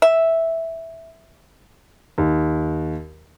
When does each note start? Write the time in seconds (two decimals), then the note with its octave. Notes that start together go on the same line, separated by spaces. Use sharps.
0.02 E5
2.18 D#2